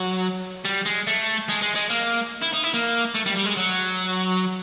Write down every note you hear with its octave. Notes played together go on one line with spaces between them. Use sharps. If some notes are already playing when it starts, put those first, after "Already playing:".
Already playing: F#3
G3
G#3
A3
G#3
G#3
G#3
A#3
E4
D#4
E4
A#3
A3
G3
G3
G#3
F#3